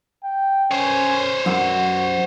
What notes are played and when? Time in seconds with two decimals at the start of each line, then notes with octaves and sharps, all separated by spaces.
0.24 G5
0.71 C#4 C5 C#5
1.46 F#2 F#4